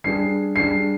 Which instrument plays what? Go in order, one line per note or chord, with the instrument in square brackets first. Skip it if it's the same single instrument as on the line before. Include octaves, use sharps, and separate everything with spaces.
[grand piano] G3 D4 G#4 [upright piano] C7
[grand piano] G3 D4 G#4 [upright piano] C7